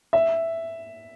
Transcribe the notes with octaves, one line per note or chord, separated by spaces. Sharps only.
E5